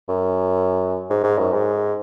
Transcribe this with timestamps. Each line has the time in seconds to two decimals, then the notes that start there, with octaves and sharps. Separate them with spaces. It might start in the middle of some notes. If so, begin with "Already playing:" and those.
0.09 F#2
1.10 G#2
1.23 G#2
1.39 F#2
1.54 G#2